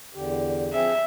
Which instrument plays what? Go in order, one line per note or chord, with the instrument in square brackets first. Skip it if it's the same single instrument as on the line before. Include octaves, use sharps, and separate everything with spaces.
[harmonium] E2 D3 G4
[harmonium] F3 C4 G#4 [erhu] E5